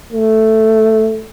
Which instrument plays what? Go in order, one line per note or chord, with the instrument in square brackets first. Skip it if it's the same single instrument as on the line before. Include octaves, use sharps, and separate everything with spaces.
[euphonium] A3